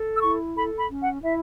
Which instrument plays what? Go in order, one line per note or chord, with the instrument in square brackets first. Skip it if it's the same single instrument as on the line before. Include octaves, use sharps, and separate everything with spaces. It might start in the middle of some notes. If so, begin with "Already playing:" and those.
Already playing: [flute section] A4
E6
E4 C#6
A4 B5
B5
C#4
F#5
E4 E5